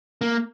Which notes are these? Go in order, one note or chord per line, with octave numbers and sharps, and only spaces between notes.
A#3